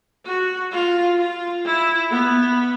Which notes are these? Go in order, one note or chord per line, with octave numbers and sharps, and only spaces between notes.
F#4
F4
F4
E4
B3